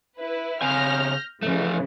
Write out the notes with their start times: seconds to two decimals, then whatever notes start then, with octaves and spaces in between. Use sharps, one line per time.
0.18 E4 B4
0.62 C#3 C4 G#5 F6 G6 A#6
1.42 C#3 E3 F3 A3